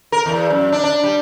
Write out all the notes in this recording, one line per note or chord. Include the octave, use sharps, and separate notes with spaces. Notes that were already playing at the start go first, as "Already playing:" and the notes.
A#4
E2
F#2
D4
D4
G3